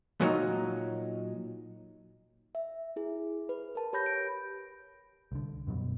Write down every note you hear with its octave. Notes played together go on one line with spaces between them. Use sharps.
A#2 F#3 D#4
E5
E4 G#4
B4
A#4 A5
G4 C#5 B5 G6 A#6
D7
C2 D3
F#2 B2 F#3 G3